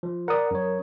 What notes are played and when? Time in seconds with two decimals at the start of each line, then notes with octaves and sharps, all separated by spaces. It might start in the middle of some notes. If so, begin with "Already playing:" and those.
0.03 F3
0.28 A#4 D5 F#5 D#6
0.51 F#2 C#5